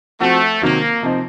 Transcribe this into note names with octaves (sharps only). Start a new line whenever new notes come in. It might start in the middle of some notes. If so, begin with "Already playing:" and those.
F3 A3 C4 F#4
C3 D#3 F#3 A#3
C3 F3 C4 D#4